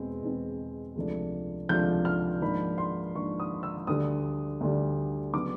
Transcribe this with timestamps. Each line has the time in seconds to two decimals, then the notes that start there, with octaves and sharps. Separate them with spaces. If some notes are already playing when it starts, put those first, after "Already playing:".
Already playing: E2 B2 G#3 C4
0.23 E2 B2 G#3 C4
0.96 C#2 C3 F3 A3 D4
1.69 C#2 C3 F3 A3 D4 G6
2.05 F6
2.42 G#2 F3 A#3 D4 B5
2.78 C6
3.15 G#2 F3 A#3 D4 C#6
3.40 D#6
3.63 E6
3.87 D2 D3 G3 D#6
4.61 D2 D3 G3
5.33 C#3 F#3 B3 D4 D6